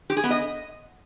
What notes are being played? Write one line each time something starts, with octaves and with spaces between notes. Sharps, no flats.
G4
G#4
B3
D#5